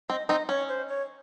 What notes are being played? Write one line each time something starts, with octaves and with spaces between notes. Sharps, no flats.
C4 D#5
C4 D#4 D#5
C#4 C#5
C5
C#5